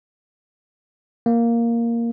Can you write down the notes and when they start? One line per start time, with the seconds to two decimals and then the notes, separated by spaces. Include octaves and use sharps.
1.26 A#3